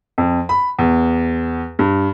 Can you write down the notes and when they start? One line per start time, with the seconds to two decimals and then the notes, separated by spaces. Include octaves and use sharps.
0.18 F2
0.49 B5
0.79 E2
1.79 G2